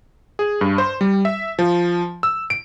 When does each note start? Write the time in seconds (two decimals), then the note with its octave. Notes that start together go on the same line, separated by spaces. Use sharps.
0.39 G#4
0.61 G2
0.78 C5
1.01 G3
1.25 E5
1.59 F3
2.23 E6
2.50 D7